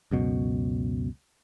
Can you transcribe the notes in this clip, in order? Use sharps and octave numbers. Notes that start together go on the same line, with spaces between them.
C#2 F#2 B2